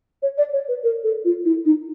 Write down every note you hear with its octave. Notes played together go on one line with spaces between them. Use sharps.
C#5
D5
C#5
B4
A#4
A4
F4
E4
D#4